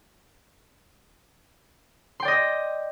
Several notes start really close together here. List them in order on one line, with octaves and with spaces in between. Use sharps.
C6 G5 D5 D#5